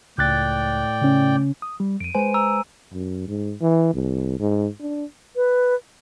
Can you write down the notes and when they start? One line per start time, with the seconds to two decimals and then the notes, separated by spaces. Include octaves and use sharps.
0.18 C#2 A2 D5 G5 F#6 A6
1.01 C#3 C#4
1.62 D#6
1.80 G3
2.00 F2 D7 D#7
2.15 G#3 B4 C5 G#5 D#7
2.34 A#5 E6
2.93 F#2
3.28 G#2
3.61 E3
3.94 C2
4.40 G#2
4.80 D4
5.36 B4